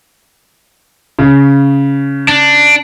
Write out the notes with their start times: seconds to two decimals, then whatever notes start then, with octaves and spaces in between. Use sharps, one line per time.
1.19 C#3
2.28 D4